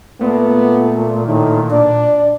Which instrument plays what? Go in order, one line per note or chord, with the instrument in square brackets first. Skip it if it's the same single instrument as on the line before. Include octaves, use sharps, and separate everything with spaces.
[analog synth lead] A#2 [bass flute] A3 [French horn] B3
[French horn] A2 [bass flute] D#3
[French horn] D4 [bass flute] D5